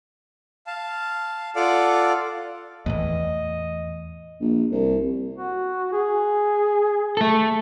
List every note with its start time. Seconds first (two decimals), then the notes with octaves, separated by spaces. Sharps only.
0.67 F5 A5
1.56 F4 A4 D5 F5 F#5 D6
2.86 E2 A2 E3 D#5
4.40 A#1
4.72 C2
5.36 F#4
5.93 G#4
7.17 A3 A4